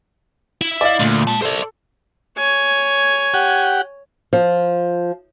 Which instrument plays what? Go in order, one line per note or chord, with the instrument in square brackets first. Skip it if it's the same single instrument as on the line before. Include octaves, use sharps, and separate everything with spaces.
[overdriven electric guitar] E4
[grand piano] D5 D#5 F5
[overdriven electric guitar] D2 [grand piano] A#2
[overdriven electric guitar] G#3 A5
[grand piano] A4 [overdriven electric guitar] C5 D5
[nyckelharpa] C#5 G#5
[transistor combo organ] G4 F#5
[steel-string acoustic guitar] F3